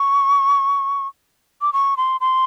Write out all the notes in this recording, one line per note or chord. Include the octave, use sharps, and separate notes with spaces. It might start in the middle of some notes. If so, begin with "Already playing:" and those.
Already playing: C#6
D6
C#6
C6
C6